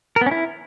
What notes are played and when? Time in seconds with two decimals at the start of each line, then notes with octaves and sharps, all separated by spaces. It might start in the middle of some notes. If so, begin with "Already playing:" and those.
0.16 A#4
0.21 B3
0.26 C#4
0.31 E4